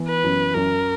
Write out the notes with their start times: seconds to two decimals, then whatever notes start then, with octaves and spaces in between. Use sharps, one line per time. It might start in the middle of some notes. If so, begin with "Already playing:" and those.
Already playing: E3 B3
0.08 B4
0.24 F#2
0.55 F#2 A#4